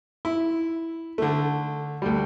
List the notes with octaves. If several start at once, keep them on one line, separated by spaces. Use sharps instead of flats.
E4
D3 A3
D2 G3